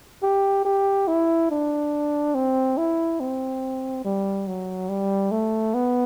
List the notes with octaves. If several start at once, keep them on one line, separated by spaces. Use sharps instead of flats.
G4
G4
E4
D4
C4
E4
C4
G3
F#3
G3
A3
B3